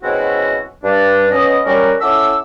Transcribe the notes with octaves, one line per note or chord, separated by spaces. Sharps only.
B2 G#3 C4 C#4 E4 F#4
G2 D4
B3 C#4 D#5
G3 C#4 F#4 A#4
C#4 E4 A4 F#5 D6 E6